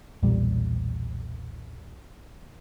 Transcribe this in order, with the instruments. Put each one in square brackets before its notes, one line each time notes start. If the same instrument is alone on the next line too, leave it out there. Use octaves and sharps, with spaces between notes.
[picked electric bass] B1 E2 A#2 G3